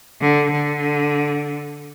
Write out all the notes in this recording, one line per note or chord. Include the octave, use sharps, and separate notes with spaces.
D3
D3